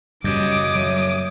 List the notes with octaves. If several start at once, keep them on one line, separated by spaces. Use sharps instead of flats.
F#2 C#3 G3 F#4 D#5 D6 D#6
F#3 C#5 E5